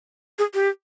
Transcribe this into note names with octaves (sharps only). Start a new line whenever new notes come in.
G#4
G4